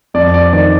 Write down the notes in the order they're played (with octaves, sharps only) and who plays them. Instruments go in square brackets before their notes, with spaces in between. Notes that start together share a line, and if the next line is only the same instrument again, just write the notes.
[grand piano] F2 D5
D5
D#3 D5